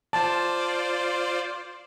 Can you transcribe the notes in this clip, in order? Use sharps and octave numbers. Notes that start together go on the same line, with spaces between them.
F4 C5 D5 A5